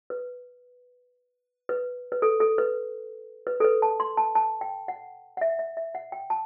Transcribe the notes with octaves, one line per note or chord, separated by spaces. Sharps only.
B4
B4
B4
A4
A4
B4
B4
A4
B4
A5
C6
A5
A5
G5
F#5
F#5
E5
E5
E5
F#5
G5
A5